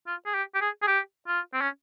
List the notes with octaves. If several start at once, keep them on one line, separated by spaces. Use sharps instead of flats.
F4
G#4
G4
G4
G#4
G#4
G4
F4
C4
C#4